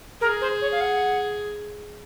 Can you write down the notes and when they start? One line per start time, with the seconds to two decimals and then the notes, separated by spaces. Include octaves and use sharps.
0.21 G#4 A#4
0.41 C5
0.61 C#5
0.72 F5
0.81 F#5